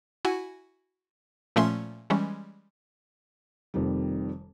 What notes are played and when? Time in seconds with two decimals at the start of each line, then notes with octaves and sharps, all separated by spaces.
0.25 E4 F#4 F#5 G#5
1.56 A#2 F3 A3 C#4 E5 C6
2.10 E3 G3 G#3 C#4
3.74 F1 F2 D#3 G3